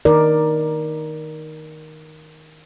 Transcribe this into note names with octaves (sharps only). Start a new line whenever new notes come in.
D#3 D#4 A#4 D5